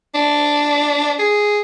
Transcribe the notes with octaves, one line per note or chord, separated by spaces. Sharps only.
D4
G#4